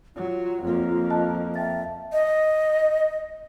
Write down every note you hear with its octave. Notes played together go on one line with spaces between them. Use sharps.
F#3 F4
F2 A#3
D#5 A5 F#6
E5 G5 A5 A6
D#5